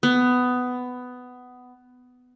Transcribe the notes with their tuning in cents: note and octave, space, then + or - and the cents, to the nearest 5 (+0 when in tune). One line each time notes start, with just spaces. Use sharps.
B3 +15